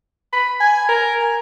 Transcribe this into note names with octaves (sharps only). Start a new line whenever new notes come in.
B5
G#5
A#4
G#5